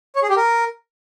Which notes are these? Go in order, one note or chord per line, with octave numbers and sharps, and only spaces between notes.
C#5
G#4
G4
A#4